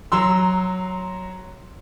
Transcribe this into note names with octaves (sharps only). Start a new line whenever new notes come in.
F#3 A#5 C6 E6